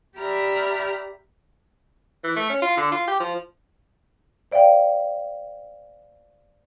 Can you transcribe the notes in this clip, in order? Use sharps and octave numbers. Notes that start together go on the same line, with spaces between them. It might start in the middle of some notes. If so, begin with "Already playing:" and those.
G4 D5 E5 A#5 B5 F6
E3
A3
C#4
F4
D3
F4
G4
F3
C5 D5 E5 F5 G5